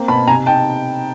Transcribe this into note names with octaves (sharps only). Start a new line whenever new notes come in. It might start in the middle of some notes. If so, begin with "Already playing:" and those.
Already playing: A#3 C4
B2 A5 B5
C3 G#5 A#5
D#4 G5 A5